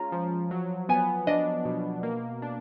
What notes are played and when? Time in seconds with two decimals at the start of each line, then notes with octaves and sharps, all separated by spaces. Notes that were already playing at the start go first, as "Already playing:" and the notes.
Already playing: G#3 C#4 F4 A#5
0.12 F3
0.51 F#3
0.89 B3 G#5
1.27 D4 D#5
1.65 B2
2.03 A#3
2.42 D4